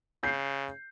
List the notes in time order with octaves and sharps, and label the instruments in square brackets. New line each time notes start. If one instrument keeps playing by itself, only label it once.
[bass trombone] C#3 [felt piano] G6 C7